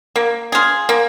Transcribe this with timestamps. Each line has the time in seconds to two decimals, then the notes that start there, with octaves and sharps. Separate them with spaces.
0.16 A#3
0.52 F4 G#4
0.89 A#3